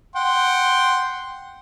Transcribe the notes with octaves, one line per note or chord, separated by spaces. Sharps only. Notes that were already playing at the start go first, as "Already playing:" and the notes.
F#5 G5 C6